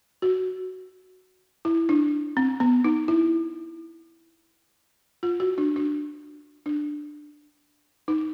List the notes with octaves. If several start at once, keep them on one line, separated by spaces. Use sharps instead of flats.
F#4
E4
D4
C4
B3
D#4
E4
F4
F#4
D4
D4
D4
D#4